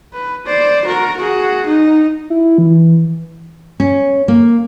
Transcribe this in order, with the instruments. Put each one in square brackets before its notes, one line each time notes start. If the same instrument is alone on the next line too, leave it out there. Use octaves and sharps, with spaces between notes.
[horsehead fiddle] B4
C5 D5
F#4 A#4
F#4 G#4
D#4
[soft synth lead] E4
E3
[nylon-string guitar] C#4
A#3